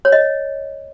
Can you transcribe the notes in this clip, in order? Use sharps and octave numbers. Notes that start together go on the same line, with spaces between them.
C#5
D#5